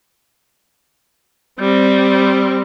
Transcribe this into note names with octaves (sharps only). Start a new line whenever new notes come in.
G3 C4